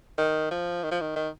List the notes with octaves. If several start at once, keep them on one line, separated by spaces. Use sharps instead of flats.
D#3
F3
D#3
F3
D#3
D#3